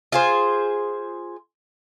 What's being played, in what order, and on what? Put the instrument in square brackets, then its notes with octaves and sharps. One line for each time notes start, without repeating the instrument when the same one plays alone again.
[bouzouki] F4 G#4 C5